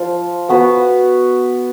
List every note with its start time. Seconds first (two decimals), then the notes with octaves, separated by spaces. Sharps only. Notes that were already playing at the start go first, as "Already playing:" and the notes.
Already playing: F3 F4
0.49 B3 F#4 B4